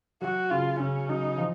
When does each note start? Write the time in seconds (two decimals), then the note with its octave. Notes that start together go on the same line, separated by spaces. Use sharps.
0.21 F#3 F#4
0.50 C#3 F4
0.79 C#3 C#4
1.09 F#3 D#4
1.38 F3